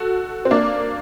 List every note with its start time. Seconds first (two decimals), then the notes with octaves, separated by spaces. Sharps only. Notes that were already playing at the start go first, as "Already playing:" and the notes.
Already playing: F#4 A4
0.45 C4
0.51 A#3 D4